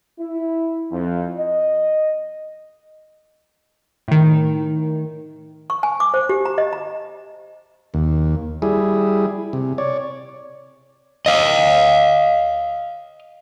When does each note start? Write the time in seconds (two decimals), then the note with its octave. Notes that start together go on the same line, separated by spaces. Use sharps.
0.19 E4
0.92 F2
1.38 D#5
4.08 A2 D#3
5.70 C#6
5.83 G#5
6.00 D6
6.14 C5
6.29 G4
6.45 A#5
6.58 D#5
6.73 A#5
7.94 D#2
8.62 G3 E4 G#4
9.53 C3
9.78 C#5 D5
11.26 D#5 F5